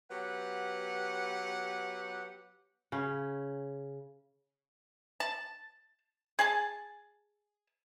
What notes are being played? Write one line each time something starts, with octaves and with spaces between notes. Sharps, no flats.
F#3 B3 G4 B4 F#5
C#3 C#4
A5
G#4 G#5 A5